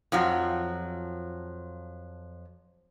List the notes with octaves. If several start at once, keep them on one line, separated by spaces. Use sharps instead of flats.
F2 F3 F#3